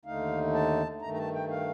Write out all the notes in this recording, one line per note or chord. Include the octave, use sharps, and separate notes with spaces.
D#2 D3 A3 D#4 F5
A5
G2 D#3 A3 A#5
A#5
A5
G5
F5